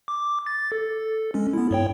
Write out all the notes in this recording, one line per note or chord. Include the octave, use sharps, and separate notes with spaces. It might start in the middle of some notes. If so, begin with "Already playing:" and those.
D6
A6
A4
G#3 C#4
B3 E4
G2 C#5 G5